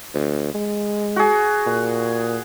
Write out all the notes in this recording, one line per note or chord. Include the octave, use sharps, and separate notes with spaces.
D2
G#3
F#4 G#4
A#2